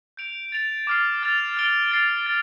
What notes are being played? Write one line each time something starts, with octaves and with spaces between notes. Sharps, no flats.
G6 D7 F7
A6 D7 F7
D6 F6 C7
F6 A6 F7
F6 D7 G7
A6 C7 F7
F6 A6